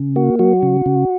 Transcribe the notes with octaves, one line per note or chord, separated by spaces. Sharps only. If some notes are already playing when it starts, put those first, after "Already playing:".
Already playing: C#3
A#3 F#4
F#3 F#4
C#3
C#3